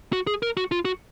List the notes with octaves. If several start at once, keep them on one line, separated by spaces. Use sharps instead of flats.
F#4
G#4
A#4
F#4
F4
F#4